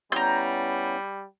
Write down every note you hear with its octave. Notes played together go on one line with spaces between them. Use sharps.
G3 B3 C#4 E4 A#5 G6